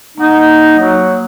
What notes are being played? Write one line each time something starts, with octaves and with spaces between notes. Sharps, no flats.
A#3 D#4 F#5 D#6
F#3